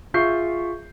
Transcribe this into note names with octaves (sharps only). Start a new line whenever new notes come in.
F4 G#4 E5 C#6 G6 C7